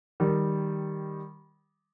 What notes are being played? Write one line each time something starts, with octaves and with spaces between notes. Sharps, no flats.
D#3 G3